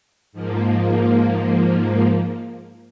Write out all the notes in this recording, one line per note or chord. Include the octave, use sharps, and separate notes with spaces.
G#2 F3 A#3